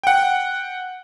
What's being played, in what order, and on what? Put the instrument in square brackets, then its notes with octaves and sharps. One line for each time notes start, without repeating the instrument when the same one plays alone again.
[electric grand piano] F#5 G5